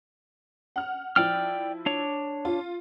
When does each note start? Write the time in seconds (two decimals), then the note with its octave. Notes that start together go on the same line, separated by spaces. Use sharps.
0.76 F#5 F6
1.16 F3 E4 D5 G5 F6
1.86 D4 C#5
2.45 F4